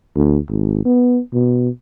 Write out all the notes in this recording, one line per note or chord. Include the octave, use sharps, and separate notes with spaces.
D2
G#1
B3
B2